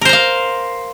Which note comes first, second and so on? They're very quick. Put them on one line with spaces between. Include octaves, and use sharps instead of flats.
A#4 C5 A#5 F5